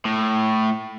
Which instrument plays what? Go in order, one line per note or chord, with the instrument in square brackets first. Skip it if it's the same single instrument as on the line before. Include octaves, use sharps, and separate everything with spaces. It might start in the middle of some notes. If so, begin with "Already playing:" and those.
[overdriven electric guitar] A2